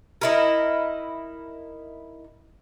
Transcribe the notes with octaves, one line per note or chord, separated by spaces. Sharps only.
D#4 E4 A#4